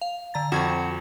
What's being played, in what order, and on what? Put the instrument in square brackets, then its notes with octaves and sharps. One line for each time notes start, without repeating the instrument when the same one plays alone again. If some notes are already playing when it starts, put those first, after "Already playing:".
[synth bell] F5
D3 A#5 A6
[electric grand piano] F2 [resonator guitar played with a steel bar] C4 F#4 [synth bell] G#6 E7